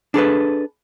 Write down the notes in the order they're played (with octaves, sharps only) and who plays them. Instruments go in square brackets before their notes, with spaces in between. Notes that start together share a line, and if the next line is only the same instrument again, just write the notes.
[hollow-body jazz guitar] D4 G#4 A4 B4